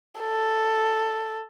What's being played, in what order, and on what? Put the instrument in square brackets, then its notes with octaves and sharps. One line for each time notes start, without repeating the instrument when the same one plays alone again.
[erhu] A4